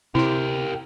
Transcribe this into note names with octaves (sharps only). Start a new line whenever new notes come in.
C3 E4 G4 A#4 C6